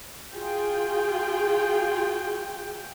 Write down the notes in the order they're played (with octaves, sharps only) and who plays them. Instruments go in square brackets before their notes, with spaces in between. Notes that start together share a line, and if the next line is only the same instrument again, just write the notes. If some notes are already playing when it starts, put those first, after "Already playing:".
[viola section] F4 F#4 G#4 G5